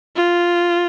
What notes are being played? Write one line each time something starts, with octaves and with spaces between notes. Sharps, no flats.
F4